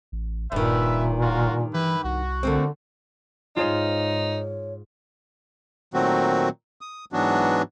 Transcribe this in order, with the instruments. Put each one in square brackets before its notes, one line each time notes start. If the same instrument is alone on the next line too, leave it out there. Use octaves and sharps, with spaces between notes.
[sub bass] A1
[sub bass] D#1 [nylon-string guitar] G2 D#3 [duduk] A#2 [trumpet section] B4 E5
[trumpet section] F4 F#4 A#4
[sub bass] E3 [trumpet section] E4 G4 B4
[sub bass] C2 [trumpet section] F#4
[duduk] D3 [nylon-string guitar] A3 A#3 C4
[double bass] G#2 [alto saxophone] D#4 [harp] F4 G#4 C5 [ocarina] C#5
[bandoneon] A#2 D#3 F#3 A3 C4 F#4
D#6
G#2 E3 F#3 B3 D4 F#4